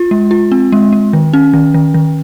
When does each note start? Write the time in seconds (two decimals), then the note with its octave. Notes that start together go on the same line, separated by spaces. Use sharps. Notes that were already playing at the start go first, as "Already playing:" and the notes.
Already playing: F4
0.11 G#3
0.31 F4
0.52 C4
0.72 G#3
0.93 G#3
1.13 D#3
1.33 C#4
1.54 D#3
1.74 D#3
1.94 D#3